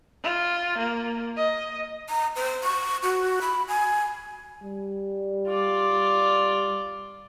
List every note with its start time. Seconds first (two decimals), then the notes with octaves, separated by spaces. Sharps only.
0.23 F4
0.78 A#3
1.37 D#5
2.09 A#5
2.36 C5
2.64 C#6
3.03 F#4
3.42 B5
3.68 G#5
4.62 G3
5.47 F4 D5